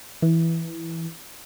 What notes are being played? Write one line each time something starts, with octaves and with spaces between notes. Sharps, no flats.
E3